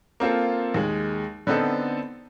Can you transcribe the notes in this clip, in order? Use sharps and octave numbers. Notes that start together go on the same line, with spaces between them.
A#3 C4 F4 A4
D#2 G#3
D3 B3 C4 D#4 A4